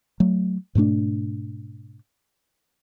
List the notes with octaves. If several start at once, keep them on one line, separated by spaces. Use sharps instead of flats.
F#3 A3
G#2 B2 A3 D4